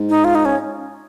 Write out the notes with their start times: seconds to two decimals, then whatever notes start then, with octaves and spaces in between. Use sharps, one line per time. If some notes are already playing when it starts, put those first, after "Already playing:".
Already playing: G#2
0.09 D#4
0.24 F4
0.35 D#4
0.45 C#4